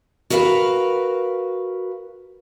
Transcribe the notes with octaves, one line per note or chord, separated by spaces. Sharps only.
F#4 A#4 B4 D#5 F5